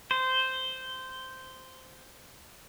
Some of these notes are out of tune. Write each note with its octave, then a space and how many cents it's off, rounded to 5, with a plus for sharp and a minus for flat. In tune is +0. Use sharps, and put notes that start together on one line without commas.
C5 -10